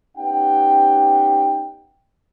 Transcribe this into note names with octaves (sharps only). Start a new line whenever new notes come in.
B3 C#4 D#4 G4 F#5 G5